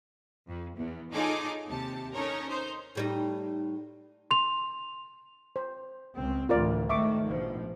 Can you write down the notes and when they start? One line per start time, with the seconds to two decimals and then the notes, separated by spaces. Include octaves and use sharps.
0.48 F2
0.77 E2 B3
1.13 D#4 F4 G#4 A4 C#5 D6
1.67 D#2 C3 G4 A5
2.13 C#4 D#4 A4 A#4 C#5
2.49 D#4 C5
2.95 A2 G3 D#4
4.31 C6 F7
5.56 C5
6.16 C#2 C4
6.49 D2 A2 E3 F4 A#4 D5
6.89 G#1 D#3 A3 E5 C#6 D6
7.26 A#1 B2 F3